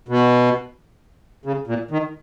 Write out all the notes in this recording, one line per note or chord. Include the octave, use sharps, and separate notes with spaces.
B2
C#3
A#2
D#3